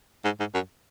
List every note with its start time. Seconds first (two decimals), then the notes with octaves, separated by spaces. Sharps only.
0.25 G#2
0.40 G#2
0.54 F#2